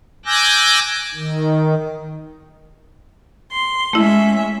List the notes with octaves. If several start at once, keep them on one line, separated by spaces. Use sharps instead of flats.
G#5 D6 E6 F#6 G6 A#6
D#3
C6
G#3 A3 C#4 E4 E5